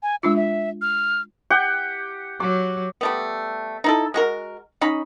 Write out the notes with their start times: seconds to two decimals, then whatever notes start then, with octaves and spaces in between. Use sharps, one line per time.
0.03 G#5
0.23 G#3 D4 F4 E6
0.36 E5
0.82 F6
1.50 G4 F#5 G5
2.40 F#3 D6
3.01 G3 A3 B3
3.84 D#4 E4 A4
4.14 G#3 F#4 A#4
4.81 C#4 D#4 B5